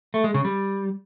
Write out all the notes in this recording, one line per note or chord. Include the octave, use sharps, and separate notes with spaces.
A3
G#3
C#3
G3